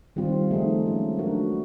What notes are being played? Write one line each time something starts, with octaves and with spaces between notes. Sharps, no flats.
D#3 G3 C4 F4
F3 A3 C4 D#4 G#4
G#3 C#4 F4
F#3 A3 D4 F#4 A#4